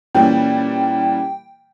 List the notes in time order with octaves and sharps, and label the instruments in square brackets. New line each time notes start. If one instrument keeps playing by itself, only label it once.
[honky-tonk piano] A#2 E3 G3 [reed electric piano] C#4 [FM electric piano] G5